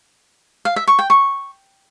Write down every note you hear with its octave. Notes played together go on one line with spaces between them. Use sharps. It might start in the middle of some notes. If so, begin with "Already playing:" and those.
F5
E5
C#6
G5
C#6